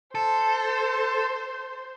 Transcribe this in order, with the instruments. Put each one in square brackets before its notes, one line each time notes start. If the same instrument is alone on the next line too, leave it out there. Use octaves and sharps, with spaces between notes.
[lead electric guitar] A4 [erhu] C5